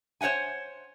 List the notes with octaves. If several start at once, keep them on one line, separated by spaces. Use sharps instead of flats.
C5 C#5 E5 F#5 G#5